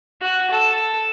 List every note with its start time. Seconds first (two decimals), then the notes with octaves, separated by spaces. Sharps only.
0.22 F#4
0.51 A4